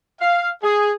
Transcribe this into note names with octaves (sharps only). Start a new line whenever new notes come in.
F5
G#4